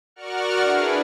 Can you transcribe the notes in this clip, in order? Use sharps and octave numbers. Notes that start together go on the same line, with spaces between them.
F#4 A#4 D5 F#5 C#6 F6
D4 E4 G#4 B4